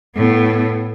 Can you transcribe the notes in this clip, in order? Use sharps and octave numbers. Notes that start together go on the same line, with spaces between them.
A2 B3